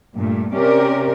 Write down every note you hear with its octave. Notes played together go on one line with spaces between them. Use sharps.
G2 A#2 A3
C3 C#4 G4 A#4 D5